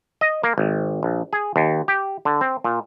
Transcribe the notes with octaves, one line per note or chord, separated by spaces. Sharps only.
D#5
A#3
G#1
A#1
G#4
D#2
G4
D3
C4
A#2